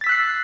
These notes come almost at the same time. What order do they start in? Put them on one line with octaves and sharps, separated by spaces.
A6 B6 E6 F#6 C7